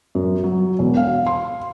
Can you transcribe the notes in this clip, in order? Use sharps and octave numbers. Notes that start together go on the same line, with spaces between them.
F#2
F#3
E1
F5
C6